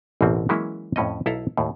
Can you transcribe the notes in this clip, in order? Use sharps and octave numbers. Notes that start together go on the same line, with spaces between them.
A1 E2 B2 A#3 C4
E3 F#3 G#3 A#3 C#4 E4
F2 A2 C#4 D#5
B1 E4 A4 F5 A#5
D#2 A2